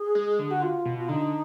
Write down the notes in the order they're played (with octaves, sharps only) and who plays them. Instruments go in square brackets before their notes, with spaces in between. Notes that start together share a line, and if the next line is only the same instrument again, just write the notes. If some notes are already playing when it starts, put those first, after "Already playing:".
Already playing: [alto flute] G#4
[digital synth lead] G#3
D3
[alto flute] F#4
F4
[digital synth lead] B2
[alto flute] F4
[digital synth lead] D3 [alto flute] D#4